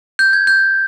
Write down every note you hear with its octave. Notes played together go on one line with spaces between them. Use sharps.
G6
G#6
G6